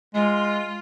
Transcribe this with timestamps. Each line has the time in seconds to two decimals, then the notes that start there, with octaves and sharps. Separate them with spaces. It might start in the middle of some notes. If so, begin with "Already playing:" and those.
0.14 G#3 F4